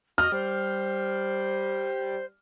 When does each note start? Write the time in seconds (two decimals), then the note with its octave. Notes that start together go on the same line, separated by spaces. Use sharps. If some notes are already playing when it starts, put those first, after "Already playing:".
0.18 F#4 D#5 F6
0.32 G3 C5